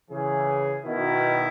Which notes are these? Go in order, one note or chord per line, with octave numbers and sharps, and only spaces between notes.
C#3 E3 G#4
B2 D#3 E4